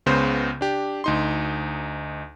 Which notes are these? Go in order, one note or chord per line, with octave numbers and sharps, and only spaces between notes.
C#2 C#3 B3 C5 G6
D4 G4
D2 D#4 C6